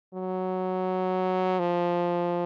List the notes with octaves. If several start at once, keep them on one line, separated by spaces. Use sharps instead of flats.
F#3
F3